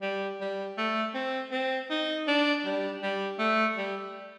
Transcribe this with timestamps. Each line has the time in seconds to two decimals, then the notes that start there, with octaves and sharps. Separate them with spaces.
0.02 G3
0.40 G3
0.78 A3
1.14 C4
1.52 C4
1.90 D#4
2.27 D4
2.65 G3
3.02 G3
3.39 A3
3.77 G3